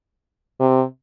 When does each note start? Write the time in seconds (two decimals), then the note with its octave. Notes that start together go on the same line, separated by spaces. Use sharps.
0.60 C3